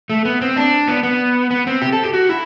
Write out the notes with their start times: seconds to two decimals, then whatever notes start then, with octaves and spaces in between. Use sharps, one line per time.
0.10 A3
0.25 B3
0.41 C4
0.56 D4
0.88 B3
1.03 B3
1.51 B3
1.67 C4
1.82 G4
1.92 A4
2.04 G4
2.13 F#4
2.29 E4